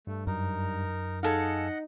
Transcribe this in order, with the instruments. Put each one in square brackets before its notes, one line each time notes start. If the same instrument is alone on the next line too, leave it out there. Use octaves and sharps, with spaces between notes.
[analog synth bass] G2 [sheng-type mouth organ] A3
[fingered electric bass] F#2 [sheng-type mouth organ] D#4 A#4
[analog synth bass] D#4 [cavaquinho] G#4 A4 F5 [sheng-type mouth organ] D#5 F#5